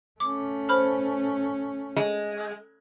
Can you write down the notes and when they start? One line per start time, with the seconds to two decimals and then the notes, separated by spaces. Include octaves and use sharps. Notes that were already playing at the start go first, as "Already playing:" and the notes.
0.20 A3 C#4 D6
0.69 C5 B5 F6
1.96 G#3